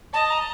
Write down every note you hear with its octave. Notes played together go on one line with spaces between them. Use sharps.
D#5 A5
A#5